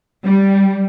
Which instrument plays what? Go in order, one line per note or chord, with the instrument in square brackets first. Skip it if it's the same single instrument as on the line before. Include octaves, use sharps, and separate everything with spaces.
[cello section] G3